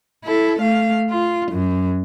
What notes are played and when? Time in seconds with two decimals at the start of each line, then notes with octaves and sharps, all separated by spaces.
0.24 E4 A4
0.59 A3 F5
1.10 F4
1.52 F#2